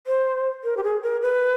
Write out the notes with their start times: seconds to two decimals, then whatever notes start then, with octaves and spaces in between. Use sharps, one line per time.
0.07 C5
0.64 A#4
0.77 G4
0.83 G#4
1.03 A#4
1.22 B4